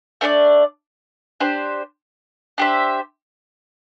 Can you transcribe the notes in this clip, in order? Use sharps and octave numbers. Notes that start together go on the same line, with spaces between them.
A3 D4 A4 D5
D4 G4 C5
D4 G4 C5 E5